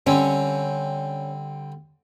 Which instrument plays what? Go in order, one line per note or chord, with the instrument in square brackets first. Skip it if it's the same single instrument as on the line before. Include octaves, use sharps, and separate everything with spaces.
[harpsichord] D3 G3 C4 [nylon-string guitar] C#4